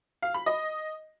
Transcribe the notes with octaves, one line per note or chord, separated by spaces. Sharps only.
F5
B5
D#5